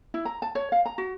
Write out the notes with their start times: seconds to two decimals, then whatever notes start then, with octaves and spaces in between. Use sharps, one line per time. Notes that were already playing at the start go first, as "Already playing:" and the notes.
0.14 E4
0.25 A#5
0.42 A5
0.55 C#5
0.72 F5
0.86 A#5
0.98 F#4